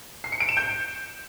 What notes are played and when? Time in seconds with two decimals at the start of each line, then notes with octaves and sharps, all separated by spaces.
0.24 C7
0.32 C#7
0.40 D7
0.49 E7
0.57 G6